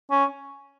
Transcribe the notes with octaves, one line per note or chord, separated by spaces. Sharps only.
C#4